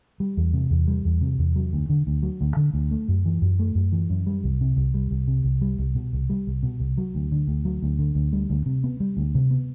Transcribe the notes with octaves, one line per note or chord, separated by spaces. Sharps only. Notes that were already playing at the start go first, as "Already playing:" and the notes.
G3
E2
C3
E2
G3
E2
C3
E2
F#3
D2
D3
D2
F#3
D2
D3
D2
A3
F#2
E3
F#2
A3
F#2
E3
F#2
G3
C2
C3
C2
G3
C2
C3
C2
G3
C2
B2
C2
G3
C2
B2
C2
F#3
D2
D3
D2
F#3
D2
D3
D2
G3
D2
C3
B3
G3
D2
C3
B3